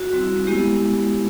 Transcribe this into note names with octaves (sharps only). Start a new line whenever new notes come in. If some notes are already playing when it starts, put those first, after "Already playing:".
Already playing: F#4
G3 C4 E4
G#3 B3 E4 G4